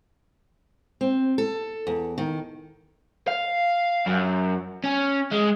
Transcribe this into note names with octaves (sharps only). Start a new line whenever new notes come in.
C4
A4
E2
D#3
F5
F#2
C#4
G#3